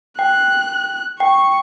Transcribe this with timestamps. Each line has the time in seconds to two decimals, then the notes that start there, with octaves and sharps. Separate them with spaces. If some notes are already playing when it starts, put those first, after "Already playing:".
0.19 G5 F#6
1.20 G5 C#6